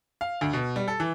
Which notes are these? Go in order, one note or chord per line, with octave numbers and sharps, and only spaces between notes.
F5
D2
B2
G3
A4
E3